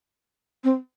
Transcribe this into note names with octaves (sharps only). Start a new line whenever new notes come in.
C4